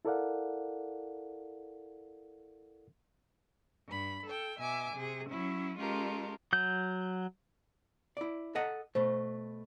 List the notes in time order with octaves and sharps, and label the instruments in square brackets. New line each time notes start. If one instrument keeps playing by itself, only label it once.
[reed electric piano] E4 A4 A#4 D5 F5 F#5
[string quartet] G2 B5
A4 G5
B2 E5 G#5 D6
C3 G#4
F#3 C#4 E4
G#3 C#4 F4 G4 A4 A#4
[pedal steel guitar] F#3 G6
[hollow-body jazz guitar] E4 D5
A4 D#5 F#5
[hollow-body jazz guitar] B2 A3 [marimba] C5